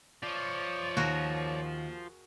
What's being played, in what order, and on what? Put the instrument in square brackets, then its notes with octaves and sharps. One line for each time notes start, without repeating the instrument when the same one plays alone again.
[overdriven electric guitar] F3 [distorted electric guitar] C#5 D5
[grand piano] D#2 [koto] F#4 G#4 A#4